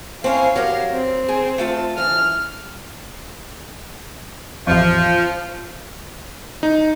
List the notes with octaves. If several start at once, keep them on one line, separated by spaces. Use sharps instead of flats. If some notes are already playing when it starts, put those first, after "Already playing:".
C4 C#4 E4 F5
F#3 G4 A#4
C4
G#4
A3 F4 A5
E3 F6
A1 F2 F3
D#4